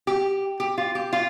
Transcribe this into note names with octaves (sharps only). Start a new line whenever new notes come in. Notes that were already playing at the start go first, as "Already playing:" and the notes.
G4
G4
F4
G4
F4